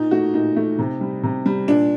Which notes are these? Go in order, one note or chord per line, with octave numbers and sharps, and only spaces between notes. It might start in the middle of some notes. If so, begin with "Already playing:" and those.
Already playing: A#2 D#4
A3 F#4
A#2 D#4
A3
C3
G3
C3
G3
A#2 D4